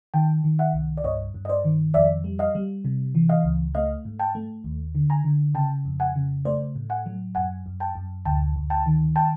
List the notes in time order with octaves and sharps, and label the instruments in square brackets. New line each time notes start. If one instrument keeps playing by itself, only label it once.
[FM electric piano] D#3 G5 A5
D#3
E5 F#5
C2
D5
G2 C#5 D#5
G2
D#5
C5 D5
D#3
F2 D5 E5
G3
D#5 F5
G3
C3
E3
D#5 F5
C#2
A3 D#5 F5
G#2
G5 A5
A3
D#2
D3
G#5 A#5
D3
C#3 G5 A5
F2
F#5 G#5
C#3
A3 C5 D5
A2
F#5 G#5
F#3
F#2 F#5 G#5
F#2
G5 A5
F#2
D2 G5 A5
D2
G5 A5
D#3
G5 A5